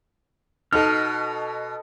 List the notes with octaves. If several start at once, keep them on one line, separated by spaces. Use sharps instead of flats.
B2 D#4 A4 F6